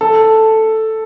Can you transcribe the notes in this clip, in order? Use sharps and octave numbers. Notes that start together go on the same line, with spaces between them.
A4